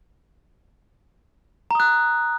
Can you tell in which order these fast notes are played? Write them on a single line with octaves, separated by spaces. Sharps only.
A#5 D#6 F#6